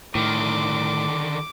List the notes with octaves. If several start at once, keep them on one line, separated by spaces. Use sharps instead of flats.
A2 D3 D#3 D6